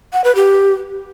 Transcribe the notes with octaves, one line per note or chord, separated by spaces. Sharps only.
F#5
B4
G4